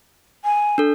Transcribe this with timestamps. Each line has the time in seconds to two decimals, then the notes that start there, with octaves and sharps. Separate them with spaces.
0.44 G#5
0.78 D4 A4